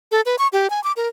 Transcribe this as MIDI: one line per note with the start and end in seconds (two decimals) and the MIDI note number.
0.12 0.21 69
0.26 0.36 71
0.39 0.48 85
0.53 0.70 67
0.70 0.83 80
0.84 0.92 86
0.97 1.08 70